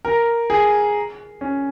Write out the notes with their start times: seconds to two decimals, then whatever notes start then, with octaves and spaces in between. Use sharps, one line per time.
0.05 A#4
0.50 G#4
1.41 C#4